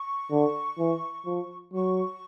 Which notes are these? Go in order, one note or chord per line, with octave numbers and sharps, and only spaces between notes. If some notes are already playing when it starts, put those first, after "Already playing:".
Already playing: C#6
D3
E3
F3
F#3 C#6